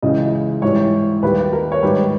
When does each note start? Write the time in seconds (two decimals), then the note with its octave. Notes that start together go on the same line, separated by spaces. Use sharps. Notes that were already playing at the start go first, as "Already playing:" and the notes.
0.02 C#2 C#3 E3 D#5
0.62 G#2 E3 G3 C#5
1.23 D#2 D#3 G3 B4
1.53 A#4
1.72 C#5
1.83 G#2 D#3 G3 B4